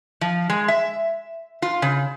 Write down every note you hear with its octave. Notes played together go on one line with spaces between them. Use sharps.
F3
G#3
E5
F4
C#3